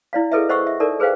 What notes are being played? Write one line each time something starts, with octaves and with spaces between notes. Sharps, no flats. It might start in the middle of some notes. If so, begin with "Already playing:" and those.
E4 D5 F5
G#4 A4 B4 D#5 E5
C5 D#5 F#5 C#6 E6
E5
D#4 A4 A#4 D5
G#4 B4 C5 F5 G5